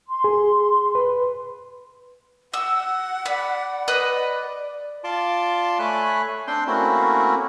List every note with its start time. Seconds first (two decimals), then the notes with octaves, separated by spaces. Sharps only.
0.07 C6
0.24 G#4
0.95 B4
2.54 F#5 E6
3.26 D5 B5
3.88 B4 D#5
5.04 F4 D5 A5 C6 D6
5.79 A3 C#5 G#5 B5 F#6
6.47 C4 D4 C5 G5 C6
6.67 A3 A#3 C4 C#4 E4 F#4